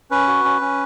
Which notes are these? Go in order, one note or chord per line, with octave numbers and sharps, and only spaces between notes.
C#4 B4
F#4
C#4
C#4